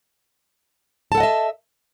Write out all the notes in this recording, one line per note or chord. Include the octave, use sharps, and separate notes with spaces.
A4 D#5 E5 F#5 A5